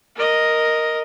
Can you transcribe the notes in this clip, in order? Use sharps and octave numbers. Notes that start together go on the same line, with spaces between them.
A#4 D#5